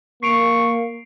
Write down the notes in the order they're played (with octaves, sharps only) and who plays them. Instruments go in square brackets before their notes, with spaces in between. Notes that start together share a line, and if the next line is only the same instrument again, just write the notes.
[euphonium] A#3 [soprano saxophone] C#6 [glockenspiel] C7 D7 F7